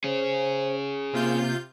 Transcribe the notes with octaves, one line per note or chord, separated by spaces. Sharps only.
C#4 G#4 C5
C3 A#3 F4 G6